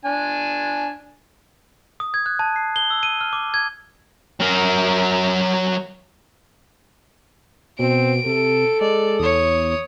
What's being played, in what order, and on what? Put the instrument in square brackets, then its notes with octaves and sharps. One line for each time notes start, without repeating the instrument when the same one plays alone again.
[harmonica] D4 G#5
[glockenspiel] D#6
G#6
F#6
A5
C7
G7
E6
D#7
F6
D6
G#6
[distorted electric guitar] F#3 A#4
[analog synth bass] B2 [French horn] C4 [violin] D7
[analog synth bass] C3 [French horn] A4
[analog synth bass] G#3 [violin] D5
[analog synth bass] E2 [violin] C#5 D#6